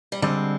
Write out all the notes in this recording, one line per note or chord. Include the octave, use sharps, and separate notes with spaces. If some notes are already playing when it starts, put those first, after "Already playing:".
G3
D3 G3 G#3 C4